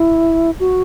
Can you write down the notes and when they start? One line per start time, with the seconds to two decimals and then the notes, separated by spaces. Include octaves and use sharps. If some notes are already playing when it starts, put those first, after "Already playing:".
Already playing: E4
0.60 F#4